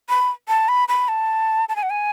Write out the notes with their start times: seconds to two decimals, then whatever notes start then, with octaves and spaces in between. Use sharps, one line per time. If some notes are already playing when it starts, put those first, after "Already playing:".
0.09 B5
0.48 A5
0.68 B5
0.89 B5
1.08 A5
1.69 A5
1.76 G#5
1.83 F#5
1.90 G#5